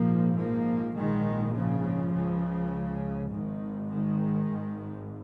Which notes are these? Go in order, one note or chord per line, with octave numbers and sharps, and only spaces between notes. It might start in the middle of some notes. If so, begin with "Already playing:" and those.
Already playing: A#1 G#2 F3 A#3
F3 A#3
A#1 G#2 D#3 G#3
C#3 F3
C#2 C#3
G#1 G#2 D#3
D#3 G#3
G#1 G#2